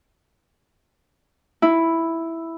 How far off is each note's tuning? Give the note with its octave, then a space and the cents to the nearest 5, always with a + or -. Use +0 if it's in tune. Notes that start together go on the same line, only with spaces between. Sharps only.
E4 +0